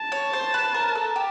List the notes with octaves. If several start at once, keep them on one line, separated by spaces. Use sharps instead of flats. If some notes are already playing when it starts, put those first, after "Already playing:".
Already playing: A5
C#5
C5
B4
A#4
A4
G4